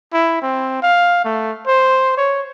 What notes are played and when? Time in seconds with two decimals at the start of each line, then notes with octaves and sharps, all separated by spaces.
0.13 E4
0.42 C4
0.82 F5
1.25 A3
1.67 C5
2.17 C#5